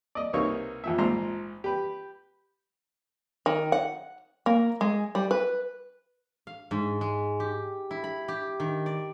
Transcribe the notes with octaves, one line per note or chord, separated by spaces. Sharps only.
D5 D#5
C2 B2 A#3 D#4 C#5 C#6
F2 A#2 E5
A#1 G#2 F3 A#5 C6
G4 B4
D#3
F#5
A#3
G#3
G3
B4
F5
G#2
G#3
G4
E4
B5
G4
D#3
D5